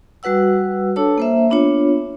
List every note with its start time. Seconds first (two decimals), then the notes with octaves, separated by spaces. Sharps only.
0.23 G3 F#4 B4 F#5 E6
0.96 D4 A4 C#5 A5 E6
1.18 A#3 C5 E5
1.50 B3 D4 F4 C#5